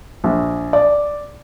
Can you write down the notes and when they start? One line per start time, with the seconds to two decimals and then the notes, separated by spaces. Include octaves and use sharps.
0.24 A#1
0.73 D5